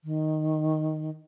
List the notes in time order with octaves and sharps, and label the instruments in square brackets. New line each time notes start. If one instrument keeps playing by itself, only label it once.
[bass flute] D#3